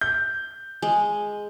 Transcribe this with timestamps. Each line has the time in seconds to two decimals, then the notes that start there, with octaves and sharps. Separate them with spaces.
0.01 G6
0.82 G#3